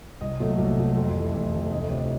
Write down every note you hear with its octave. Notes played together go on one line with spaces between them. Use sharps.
C2 D#5
A#2 F#3 A3
C2
A#2 F#3 A3
F2
C3 E3 A3
F2
C3 E3 A3
D2 D#5
C3 F3 C#5